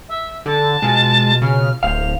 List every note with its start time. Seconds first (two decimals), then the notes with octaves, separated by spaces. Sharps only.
0.09 E5
0.46 D3 A5
0.82 B2 G#3 F4 F#4
1.42 C#3 F6
1.83 D1 C5 F5 F7